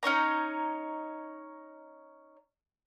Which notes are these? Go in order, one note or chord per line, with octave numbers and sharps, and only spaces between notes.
C#4 D#4 C#5 A#5